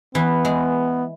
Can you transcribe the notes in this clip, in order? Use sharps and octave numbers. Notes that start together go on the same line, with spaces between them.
E3 B3
G#3